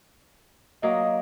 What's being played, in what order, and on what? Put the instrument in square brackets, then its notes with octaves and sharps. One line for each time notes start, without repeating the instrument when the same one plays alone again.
[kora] F#3 A#3 [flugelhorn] D#5